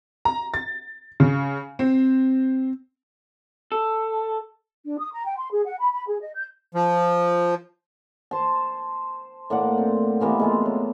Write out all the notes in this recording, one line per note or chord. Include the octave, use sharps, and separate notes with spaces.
A#5
A6
C#3
C4
A4
D4
D#6
A#5
G5
C6
G#4
F#5
B5
B5
G#4
D#5
G6
F3
C5 A5
A2 A#3 D5 F#5
C4
C3 E3 A#3 B3
G#3 A3 F4
F#3